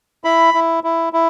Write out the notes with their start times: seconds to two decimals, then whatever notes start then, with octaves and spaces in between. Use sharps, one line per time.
0.24 E4 B5
0.54 E4
0.84 E4
1.13 E4